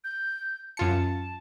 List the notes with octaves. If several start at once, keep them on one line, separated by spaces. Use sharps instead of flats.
G6
F#2 F4 A5 C#7